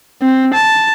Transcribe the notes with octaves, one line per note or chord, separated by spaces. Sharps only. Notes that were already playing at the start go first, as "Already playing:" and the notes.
C4
A5